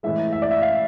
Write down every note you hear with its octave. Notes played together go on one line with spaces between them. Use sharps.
A2 E3 G#3 E5
E5
D5
E5
F5